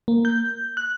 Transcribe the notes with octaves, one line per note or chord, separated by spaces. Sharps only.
A#3
G6
F#6